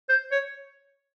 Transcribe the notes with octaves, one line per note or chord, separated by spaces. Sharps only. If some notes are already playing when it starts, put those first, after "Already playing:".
C5
C#5